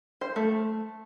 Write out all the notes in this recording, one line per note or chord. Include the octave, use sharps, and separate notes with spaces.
C5
A3